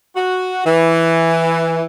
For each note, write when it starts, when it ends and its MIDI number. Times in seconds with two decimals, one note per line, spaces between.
0.16 0.63 66
0.66 1.84 52